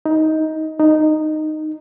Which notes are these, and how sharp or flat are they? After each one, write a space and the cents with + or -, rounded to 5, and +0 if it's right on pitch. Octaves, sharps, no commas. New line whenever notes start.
D#4 +15
D#4 -10